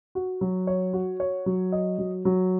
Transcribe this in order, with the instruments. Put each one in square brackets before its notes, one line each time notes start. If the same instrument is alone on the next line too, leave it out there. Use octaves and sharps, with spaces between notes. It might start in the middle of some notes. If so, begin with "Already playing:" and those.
[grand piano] F#4
F#3
C#5
F#4
C#5
F#3
D#5
F#3
F#3